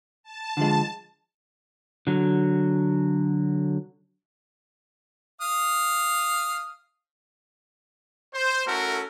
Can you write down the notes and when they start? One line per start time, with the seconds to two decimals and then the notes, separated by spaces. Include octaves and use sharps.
0.23 A5
0.57 D3 F3 G#3
2.07 D3 F#3
5.41 F5 D#6 F6
8.34 C5
8.67 A3 C#4 E4 F#4 A4 A#4